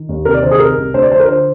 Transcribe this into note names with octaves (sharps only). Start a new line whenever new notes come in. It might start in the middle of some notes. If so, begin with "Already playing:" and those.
Already playing: D#3
D#2
C3 A#4
D5
D#3 C5
G#4
C2 A#4
C2
D2 C5
D5
F3 C5
A#4
D3 C5